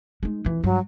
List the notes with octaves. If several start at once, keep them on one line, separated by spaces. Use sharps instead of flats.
G#3 D#4
F2 E3
G2 F#3